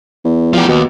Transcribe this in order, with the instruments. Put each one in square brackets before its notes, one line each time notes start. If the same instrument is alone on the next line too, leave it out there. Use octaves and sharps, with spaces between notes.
[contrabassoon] E2
[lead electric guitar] F3 G4
[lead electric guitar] D#2 [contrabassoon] B2